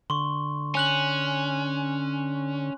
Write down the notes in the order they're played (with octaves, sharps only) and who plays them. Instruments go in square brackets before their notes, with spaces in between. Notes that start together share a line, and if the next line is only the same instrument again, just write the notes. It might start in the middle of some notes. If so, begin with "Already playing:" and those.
[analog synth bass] D3 [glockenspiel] C6 C#6
[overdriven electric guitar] C#4 [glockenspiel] G#5 F#6 F#7